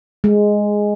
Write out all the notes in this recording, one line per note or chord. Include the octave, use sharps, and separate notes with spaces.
G#3